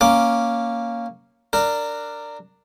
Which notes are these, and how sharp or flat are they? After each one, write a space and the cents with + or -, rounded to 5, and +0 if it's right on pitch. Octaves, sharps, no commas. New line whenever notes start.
A#3 +0 C#4 +5 D6 +0
D4 +0 A#4 -20